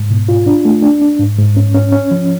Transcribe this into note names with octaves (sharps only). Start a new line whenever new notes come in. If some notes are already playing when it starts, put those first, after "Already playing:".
Already playing: G#2
B2
F4
D4
A3
D4
D4
G#2
G#2
C#4
C#4
C#4
F3